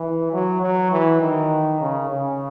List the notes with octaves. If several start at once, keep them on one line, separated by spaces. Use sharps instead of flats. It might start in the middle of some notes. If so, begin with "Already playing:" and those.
Already playing: E3
F#3
F#3
E3
D#3
C#3
C#3